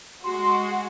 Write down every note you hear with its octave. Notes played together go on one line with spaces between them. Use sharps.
G#3 F#4 C6